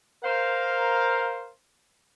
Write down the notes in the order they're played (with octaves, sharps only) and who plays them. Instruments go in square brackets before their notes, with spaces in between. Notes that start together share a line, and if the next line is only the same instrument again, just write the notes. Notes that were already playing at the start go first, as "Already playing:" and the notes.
[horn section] A#4 C5 F5